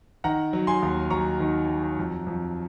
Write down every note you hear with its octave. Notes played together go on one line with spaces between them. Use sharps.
D#3 F#5 A#5
F#3
G#5 C6
D#2
F#3 A#5 C#6
D#3
F#3
F2
F2